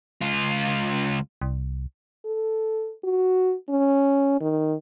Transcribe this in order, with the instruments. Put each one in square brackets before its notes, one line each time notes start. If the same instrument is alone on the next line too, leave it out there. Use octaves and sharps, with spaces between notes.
[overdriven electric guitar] C#2 F4
[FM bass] C2
[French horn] A4
F#4
C#4
D#3